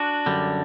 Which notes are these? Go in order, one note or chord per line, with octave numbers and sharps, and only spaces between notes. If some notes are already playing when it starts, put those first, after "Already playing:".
Already playing: D4 F#4
F#2 D3 G3